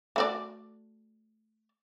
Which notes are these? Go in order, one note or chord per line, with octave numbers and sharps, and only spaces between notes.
A3 F#4 D5